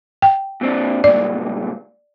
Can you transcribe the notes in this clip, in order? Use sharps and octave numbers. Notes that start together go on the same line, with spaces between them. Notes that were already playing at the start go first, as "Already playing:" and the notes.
G5
A#2 C4 D4
C#2 G2 A#2 D5